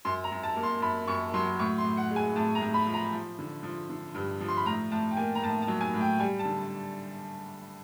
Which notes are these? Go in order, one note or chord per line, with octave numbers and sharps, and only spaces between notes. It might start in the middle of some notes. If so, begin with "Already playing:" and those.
F#2 C6
A#5
F#2
A5
A#3
C6
F#2 B5
F#2 C#6
F#3 C6
A2 C#6
C6
A2
F#5
G#3
G#5
A2 A5
A#5
A2
B5
F3
A#5
F3
D3
F3
D3
G2
F3
C6
B5
A2 A#5
A2 A5
G5
A#3 G#5
A#5
A2 A5
A5
F#3
G#5
A2
G5
G3 G#5
A5
D3